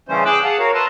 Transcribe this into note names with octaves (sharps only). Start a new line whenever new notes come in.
C#3 E3 G3 A3 C#4 C5
G#4 G5 D6 E6 F#6
G#4 F5 F#5 A5
F#4 A#4 C#5 F5
B4 E5 A5 A#5 C6